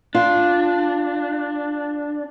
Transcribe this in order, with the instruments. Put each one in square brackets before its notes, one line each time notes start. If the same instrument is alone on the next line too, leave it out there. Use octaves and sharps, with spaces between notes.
[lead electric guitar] D4 [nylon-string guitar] F4